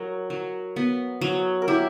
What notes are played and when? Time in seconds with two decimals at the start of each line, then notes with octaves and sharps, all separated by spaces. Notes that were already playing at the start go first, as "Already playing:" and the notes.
Already playing: F#3 A#4
0.30 F#3
0.76 B3
1.21 F#3
1.62 A#4
1.68 E4 G4